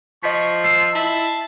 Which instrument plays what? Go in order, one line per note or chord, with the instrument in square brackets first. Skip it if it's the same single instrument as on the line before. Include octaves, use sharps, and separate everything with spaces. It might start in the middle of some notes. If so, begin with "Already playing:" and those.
[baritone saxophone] F3 [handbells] D#5 B6 [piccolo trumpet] C#6
[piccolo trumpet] E6 [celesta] C7
[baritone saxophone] E4 [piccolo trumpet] A5